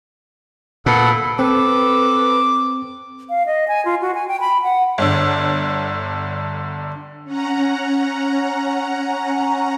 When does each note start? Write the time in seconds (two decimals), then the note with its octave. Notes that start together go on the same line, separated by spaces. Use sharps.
0.86 A#2 B3 A4 F#5
1.39 C4 A4 B4 D6
3.29 F5
3.46 D#5
3.68 G#5
3.85 F4
4.01 F#4
4.15 G#5
4.28 G5
4.40 B5
4.63 F#5
4.98 G1 D3
7.24 C#4 F#5 A#5